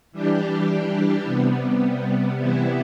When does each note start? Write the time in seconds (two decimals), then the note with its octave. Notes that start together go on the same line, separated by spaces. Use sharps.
0.12 E3 G3 D4 G4
1.24 C3 G3 B3
2.38 C3 E3 G3 B3 E4